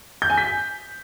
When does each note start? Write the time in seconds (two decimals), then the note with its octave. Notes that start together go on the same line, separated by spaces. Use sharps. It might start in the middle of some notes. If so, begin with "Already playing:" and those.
0.22 G6
0.30 G#5
0.38 B6